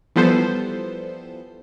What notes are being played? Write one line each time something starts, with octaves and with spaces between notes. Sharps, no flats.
E3 F3 G3 B3 A4 C5